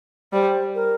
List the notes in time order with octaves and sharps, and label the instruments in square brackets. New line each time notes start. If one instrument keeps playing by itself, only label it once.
[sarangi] G3 [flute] C5
[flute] A#4